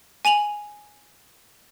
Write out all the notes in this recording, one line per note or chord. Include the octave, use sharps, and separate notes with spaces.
G#5 D#7 F7 F#7